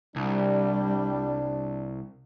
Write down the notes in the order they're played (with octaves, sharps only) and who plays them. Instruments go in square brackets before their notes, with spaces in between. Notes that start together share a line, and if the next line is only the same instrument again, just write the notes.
[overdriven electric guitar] C2 [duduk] G3 [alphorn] D4